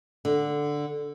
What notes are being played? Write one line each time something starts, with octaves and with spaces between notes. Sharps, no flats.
D3